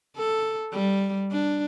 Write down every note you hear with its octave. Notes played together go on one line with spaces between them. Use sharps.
A4
G3
D4